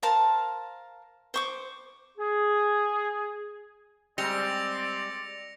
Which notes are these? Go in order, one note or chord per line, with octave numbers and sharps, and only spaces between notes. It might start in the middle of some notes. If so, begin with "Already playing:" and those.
A#4 C5 F5 A5
C5 C#6 D6
G#4
G3 G#3 C4 D5 A#6 C#7 F7